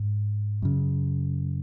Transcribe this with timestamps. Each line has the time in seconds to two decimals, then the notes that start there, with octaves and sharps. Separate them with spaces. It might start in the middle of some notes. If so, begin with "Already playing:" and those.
Already playing: G#2
0.62 F#2 C#3